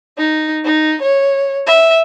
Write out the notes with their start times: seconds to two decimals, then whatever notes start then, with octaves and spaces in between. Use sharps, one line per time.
0.18 D#4
0.65 D#4
1.02 C#5
1.67 E5